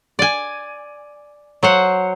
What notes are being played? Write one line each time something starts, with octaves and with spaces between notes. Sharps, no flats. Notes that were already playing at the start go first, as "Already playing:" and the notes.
D5 G#5
F#3 C5 F#5